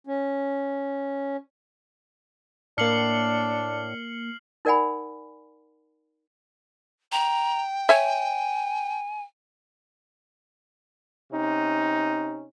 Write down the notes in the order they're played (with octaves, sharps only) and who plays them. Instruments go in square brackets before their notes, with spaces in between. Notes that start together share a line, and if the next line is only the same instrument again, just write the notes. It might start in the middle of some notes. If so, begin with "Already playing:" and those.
[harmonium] C#4
[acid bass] A2 [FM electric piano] A#3 C#7 [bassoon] D4 [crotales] F6 C7 F#7
[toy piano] D#4 A#4 D5 F#5 G#5 B5
[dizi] G5 [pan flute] A#5
[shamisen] C#5 E5 [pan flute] G#5
[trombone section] C3 C#4 D#4